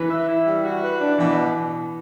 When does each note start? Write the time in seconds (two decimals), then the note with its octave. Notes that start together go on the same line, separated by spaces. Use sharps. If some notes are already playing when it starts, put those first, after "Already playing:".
Already playing: E3 B4
0.09 E5
0.28 E4
0.46 G3
0.64 F#4
0.83 B4
1.00 D4
1.18 B2 E3